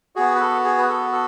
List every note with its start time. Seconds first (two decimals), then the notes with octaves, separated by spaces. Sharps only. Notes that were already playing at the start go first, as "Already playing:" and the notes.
0.16 B3 F#4 G#4
0.36 B4
0.40 A4
0.64 G#4
0.78 B4
0.89 A4
1.12 A4